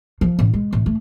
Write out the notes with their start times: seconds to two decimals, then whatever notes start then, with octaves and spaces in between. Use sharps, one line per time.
0.21 F3
0.39 A1
0.54 G#3
0.73 A1
0.86 A3